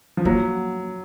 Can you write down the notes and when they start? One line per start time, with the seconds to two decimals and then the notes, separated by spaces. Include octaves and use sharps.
0.17 F3
0.25 F#3 A#3